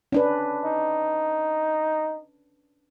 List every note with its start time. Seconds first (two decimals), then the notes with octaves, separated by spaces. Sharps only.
0.12 C#4 D4 B4
0.65 D#4